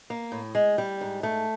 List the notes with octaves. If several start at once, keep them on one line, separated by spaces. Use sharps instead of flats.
A#3
A2
G#3
G3
G#2
A3